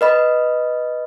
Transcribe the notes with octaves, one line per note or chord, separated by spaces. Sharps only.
B4 D#5 B5